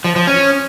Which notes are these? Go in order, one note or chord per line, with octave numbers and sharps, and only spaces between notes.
F3
F3
C#4